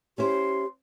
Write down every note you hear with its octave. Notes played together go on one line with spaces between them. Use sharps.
C#4 E4 G4 C5 C6